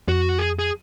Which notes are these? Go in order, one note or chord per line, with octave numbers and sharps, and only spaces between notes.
F2 F#4
G#4
G#4